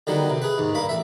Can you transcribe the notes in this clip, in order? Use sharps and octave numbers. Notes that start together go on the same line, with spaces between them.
D3 D#3 F#3 G3 B3
C3
G#4 B4
D#2 G#2
G2 A#3 B5
A1 E5